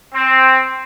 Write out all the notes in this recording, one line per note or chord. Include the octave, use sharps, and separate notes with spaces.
C4